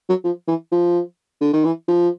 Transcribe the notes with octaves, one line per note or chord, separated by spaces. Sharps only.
F#3
F3
E3
F3
D3
D#3
E3
F3